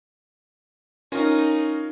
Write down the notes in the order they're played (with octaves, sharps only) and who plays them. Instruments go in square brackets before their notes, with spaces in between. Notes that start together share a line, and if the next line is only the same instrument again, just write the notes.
[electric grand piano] C#4 F4 A#4 [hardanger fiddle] D#4